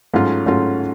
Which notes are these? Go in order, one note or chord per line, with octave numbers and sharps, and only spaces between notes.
G#2 F#3 A3 C#4 F4
G#2 F#3 A3 C#4 F4